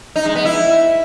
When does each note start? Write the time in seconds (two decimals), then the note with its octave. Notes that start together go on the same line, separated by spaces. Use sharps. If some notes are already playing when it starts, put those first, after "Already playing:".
0.16 D#4
0.25 G#3
0.35 B3
0.45 E4